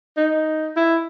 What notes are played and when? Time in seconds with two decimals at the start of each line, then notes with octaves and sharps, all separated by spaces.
0.17 D#4
0.76 E4